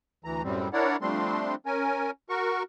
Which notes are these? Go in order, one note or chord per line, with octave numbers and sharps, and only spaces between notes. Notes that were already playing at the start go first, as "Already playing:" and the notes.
D2 E3 A#5
F#2 A2 G3 C4
D4 E4 A#4 C#5 D5 F#5
F3 G3 A3 C4 D4 C6
C#4 A#4 G#5
F#4 A#4 C#6